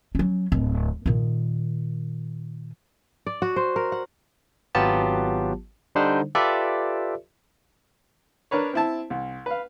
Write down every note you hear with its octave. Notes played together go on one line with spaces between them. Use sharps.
F#3 C#4
D1
A#2 D#3
D5
F#4
C5
A#4
F#5
G#1 F#3 B3 F4 G4 A5
D3 G3 D4 D#4 C5
F4 G4 A4 B4 D5 E5
D4 A#4 B4 C#5
C4 E4 A5
C2
B4 F5